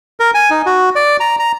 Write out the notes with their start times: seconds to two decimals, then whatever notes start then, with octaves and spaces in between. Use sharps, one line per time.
0.20 A#4
0.34 G#5
0.50 D#4
0.66 F#4
0.95 D5
1.20 A#5
1.39 A#5